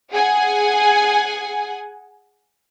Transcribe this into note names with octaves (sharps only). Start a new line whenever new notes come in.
G#4 F#5 G#5